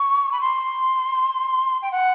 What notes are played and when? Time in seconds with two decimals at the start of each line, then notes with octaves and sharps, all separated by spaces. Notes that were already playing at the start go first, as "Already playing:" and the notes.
Already playing: C#6
0.32 B5
0.41 C6
1.82 G5
1.91 F#5